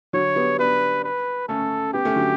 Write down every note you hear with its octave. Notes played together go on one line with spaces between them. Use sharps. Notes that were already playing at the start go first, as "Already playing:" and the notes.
D3 F#3 C#5
G3 B3
B3 D4 B4
B4
A3 C#4 A4
G3 B3 G4
A3 C#4
D3 F#3